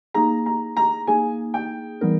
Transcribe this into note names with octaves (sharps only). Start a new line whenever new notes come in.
A#3 D#4 G#4 A#5
A#5
A#5
A#3 D#4 G#4 G#5
G5
E3 G3 B3 D#4 A#4